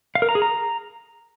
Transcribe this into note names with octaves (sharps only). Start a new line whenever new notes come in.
F5
A#4
A#5
G#4
A#5